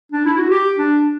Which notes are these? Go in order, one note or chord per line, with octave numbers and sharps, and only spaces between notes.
D4
E4
F#4
G4
D4